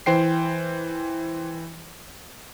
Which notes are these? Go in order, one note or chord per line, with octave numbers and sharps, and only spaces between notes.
E3 C5 G5 C7